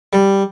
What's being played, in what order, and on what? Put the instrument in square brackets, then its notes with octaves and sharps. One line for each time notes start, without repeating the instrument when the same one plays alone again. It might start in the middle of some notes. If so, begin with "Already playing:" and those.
[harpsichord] G3